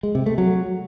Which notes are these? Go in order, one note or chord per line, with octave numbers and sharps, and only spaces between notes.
G#3
C3
A3
F#3